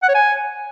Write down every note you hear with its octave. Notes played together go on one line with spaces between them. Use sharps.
F#5
C#5
G#5